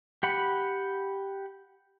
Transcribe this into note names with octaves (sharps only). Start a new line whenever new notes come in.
G4 F#5 B5